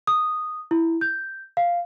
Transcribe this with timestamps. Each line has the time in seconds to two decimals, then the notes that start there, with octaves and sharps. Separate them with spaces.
0.07 D#6
0.71 E4
1.01 G6
1.57 F5